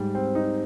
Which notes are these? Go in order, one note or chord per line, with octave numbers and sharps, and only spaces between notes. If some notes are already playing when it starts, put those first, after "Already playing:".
Already playing: G#2 G3
C4
D#4